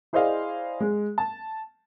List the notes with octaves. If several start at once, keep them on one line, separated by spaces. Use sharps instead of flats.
E4 G#4 C5 D5 D#5 F5
G#3
A5